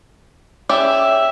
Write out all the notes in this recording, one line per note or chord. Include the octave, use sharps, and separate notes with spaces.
C#4 G4 G#4 D5 E5